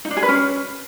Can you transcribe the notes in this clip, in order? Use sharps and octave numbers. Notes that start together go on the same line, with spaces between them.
D#4
D4
G#4
B4
C#4